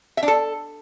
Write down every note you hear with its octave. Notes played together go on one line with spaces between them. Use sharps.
E5
D4
A4